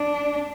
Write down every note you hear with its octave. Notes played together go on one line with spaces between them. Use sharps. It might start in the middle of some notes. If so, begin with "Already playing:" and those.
Already playing: D4